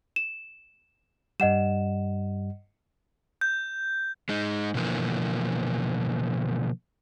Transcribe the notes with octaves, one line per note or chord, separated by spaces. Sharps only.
E7
G2 G3 D#5 F#5 E7
G6
G#3 D#4
B2 D3 E3 F3 A#3